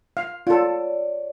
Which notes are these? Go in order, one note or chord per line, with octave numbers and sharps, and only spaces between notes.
F5
F4 A4 C#5 D5